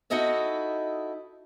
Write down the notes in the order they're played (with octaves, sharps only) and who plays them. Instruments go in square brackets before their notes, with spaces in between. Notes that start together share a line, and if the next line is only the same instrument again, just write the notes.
[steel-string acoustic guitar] D#4 E4 F#4 A4 D#5 E5